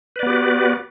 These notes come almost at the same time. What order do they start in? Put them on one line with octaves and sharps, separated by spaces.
B4 D5 B3 G4 F#4